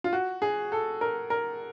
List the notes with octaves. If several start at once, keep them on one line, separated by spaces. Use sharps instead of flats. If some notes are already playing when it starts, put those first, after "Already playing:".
F4
F#4
G#4
A4
A#4
A#4